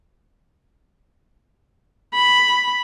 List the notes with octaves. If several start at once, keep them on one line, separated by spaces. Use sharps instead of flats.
B5